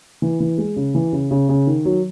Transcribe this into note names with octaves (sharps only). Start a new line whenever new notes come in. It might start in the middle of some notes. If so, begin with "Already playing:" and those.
E3
E3
G#3
C#3
E3
C#3
C#3
C#3
D#3
F#3